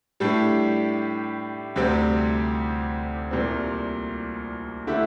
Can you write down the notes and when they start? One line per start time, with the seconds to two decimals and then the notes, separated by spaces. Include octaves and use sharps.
0.20 A2 G3 D4 G4
1.76 D2 C3 G3 C4 G4
3.31 C2 A#2 G3 C4
4.87 D3 A3 E4 G4